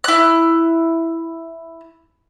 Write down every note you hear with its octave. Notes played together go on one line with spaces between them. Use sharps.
E4 F#6